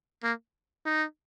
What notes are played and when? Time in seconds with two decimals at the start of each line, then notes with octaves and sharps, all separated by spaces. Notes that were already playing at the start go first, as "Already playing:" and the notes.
0.23 A#3
0.86 D#4